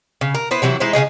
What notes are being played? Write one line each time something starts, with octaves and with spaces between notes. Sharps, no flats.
C#3
A#4
B3 E4 B4 C5
C3 E3 F#3 E4
G#3 D#4 E4 C5
C#3 E3 G#4 D#5